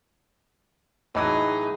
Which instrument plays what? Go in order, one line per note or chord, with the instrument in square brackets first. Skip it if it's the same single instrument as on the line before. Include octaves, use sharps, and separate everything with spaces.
[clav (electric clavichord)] A2 E3 F#3 [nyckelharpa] D#4 G#4 [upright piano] D#5 B5